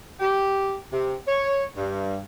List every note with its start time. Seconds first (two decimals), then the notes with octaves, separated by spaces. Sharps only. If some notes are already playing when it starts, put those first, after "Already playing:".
0.20 G4
0.91 C3
1.27 C#5
1.75 G2